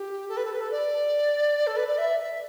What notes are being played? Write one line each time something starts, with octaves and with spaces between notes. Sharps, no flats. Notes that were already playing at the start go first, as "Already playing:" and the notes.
Already playing: G4
A4
B4
A4
B4
A4
D5
A4
B4
D5
E5
E5